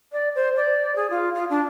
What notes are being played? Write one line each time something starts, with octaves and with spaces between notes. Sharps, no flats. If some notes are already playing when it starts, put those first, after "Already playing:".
D5
C5
D5
G#4
F4
F4
D4